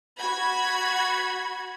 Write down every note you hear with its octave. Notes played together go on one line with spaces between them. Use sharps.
F#4 B5 G#6